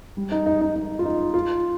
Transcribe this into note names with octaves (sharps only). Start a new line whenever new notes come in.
G3
D#4
D#4
D#4
D#4
F4
D#4
F4